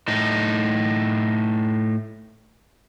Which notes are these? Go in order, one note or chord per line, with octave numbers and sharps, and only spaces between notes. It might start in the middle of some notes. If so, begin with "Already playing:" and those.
A2 D#4